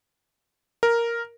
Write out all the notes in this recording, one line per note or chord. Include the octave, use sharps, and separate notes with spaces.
A#4